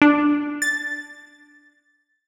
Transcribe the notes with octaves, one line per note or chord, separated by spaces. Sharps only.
D4
A6